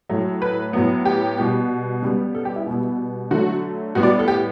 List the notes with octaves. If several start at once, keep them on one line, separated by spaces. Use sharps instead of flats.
A2 F#3 A3
B4
A2 F#3 B3
G4
B2 G3 B3
C#3 G3 B3
A4
G4
E4
B2 G3 B3
D3 F#3 A3 F#4
A2 G3 B3 F#4
D5
A4
G4